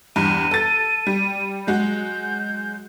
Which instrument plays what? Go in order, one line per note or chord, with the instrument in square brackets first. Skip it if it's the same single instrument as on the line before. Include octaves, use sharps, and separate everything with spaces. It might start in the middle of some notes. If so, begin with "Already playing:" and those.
[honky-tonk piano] E2 G2 [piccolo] D#7
[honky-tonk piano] A4 A6
G3
[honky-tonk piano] F#3 G#3 F#4 [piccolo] G6